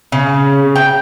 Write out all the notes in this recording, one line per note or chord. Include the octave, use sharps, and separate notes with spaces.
C#3
G5